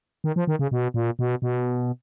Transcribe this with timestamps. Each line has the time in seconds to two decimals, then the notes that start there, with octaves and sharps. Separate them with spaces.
0.24 D#3
0.36 F3
0.47 D#3
0.59 C#3
0.71 B2
0.94 A#2
1.19 B2
1.42 B2